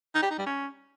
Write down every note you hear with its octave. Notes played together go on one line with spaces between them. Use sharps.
D#4
G4
D#4
G3
C#4